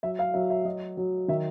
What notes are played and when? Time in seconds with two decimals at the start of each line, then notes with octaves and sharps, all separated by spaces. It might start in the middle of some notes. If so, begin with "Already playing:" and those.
0.03 F#3 E5
0.19 F5
0.34 F#3 E5
0.50 E5
0.65 F#3 D#5
0.97 F#3
1.28 D#3 E5